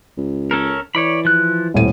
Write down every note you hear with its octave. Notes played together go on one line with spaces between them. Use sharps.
C#2
C#4 A4 A#4
E3 C#5 D5 B5
F3 F#6
D#1 A2 C3 D#7